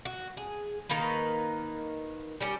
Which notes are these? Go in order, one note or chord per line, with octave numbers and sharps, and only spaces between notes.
F#4
G#4
D#3 A#3 D#4 B4
G3 C#4 G4